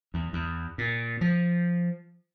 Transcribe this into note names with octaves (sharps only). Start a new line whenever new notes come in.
E2
E2
A#2
F3